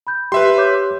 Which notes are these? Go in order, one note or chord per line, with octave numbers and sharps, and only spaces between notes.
B5 G6
G4 B4 E5 C6
C#5 D6 G6